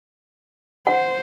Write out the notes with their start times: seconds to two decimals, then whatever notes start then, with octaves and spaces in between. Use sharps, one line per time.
0.87 C5 F#5